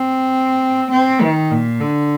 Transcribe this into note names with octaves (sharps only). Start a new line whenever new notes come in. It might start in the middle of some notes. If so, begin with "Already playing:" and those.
Already playing: C4
C4
D#3
A#2
D3